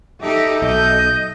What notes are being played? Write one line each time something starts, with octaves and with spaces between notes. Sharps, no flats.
D#4 G4 A4 E5
B1 D#5 G6